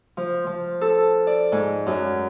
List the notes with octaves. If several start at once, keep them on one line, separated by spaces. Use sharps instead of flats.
F3
F3
A4
D5
G#2
F#2